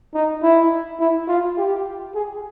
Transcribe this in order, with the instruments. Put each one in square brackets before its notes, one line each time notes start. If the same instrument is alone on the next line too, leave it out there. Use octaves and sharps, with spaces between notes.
[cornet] D#4
E4
E4
F4
G4
G#4